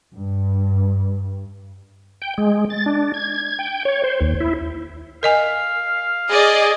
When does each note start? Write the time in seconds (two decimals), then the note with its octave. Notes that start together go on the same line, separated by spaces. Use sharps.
0.13 G2
2.22 G5
2.38 G#3
2.70 A6
2.86 D4
3.14 G#6
3.59 G5
3.85 C#5
4.04 C5
4.21 D#2
4.40 E4
5.23 A#4 D#5 F5 G#5
6.30 G#4 D5 D#5